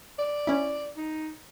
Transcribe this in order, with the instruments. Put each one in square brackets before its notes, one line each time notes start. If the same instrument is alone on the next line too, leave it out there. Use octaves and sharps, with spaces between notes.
[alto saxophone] D5
[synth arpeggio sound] C#4 E4
[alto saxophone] D#4